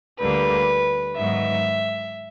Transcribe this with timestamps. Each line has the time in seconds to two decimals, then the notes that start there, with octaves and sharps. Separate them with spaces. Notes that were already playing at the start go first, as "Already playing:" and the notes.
0.18 D2 D3 G3 A#3 B4
1.16 G#2 D#3 F#3 B3 E5